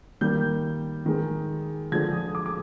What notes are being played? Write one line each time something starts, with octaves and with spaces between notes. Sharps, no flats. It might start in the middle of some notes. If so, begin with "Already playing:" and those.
D#3 G3 A#3 G6
D#3 G#3
D3 F3 G#3 G#6
D#6
D6
D6